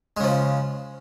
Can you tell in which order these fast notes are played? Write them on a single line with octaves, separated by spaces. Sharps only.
G#3 C#3 F3